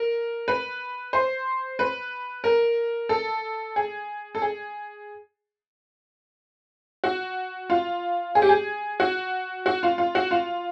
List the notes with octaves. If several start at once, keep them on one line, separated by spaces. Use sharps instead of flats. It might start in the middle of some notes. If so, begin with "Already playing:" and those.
Already playing: A#4
B4
C5
B4
A#4
A4
G#4
A4
G#4
F#4
F4
G#4
G4
G#4
F#4
F#4
F4
F4
F#4
F4